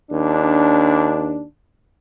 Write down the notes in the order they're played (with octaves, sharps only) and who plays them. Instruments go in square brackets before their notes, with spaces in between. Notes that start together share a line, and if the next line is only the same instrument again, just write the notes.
[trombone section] D#2 D4